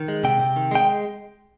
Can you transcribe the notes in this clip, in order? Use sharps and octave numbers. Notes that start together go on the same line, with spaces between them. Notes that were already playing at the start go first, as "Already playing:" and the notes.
Already playing: D#3
G#3
C3 G5
C3
D#3
G#3 G5